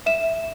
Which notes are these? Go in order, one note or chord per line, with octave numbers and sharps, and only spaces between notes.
E5 E7